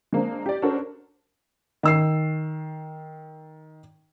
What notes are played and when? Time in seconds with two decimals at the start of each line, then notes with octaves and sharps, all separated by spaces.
0.13 G#3 A#3 C4 D4
0.46 G4 D5
0.62 C#4 D4 F#4 A4 A#4 C5
1.83 D#3 E6 C7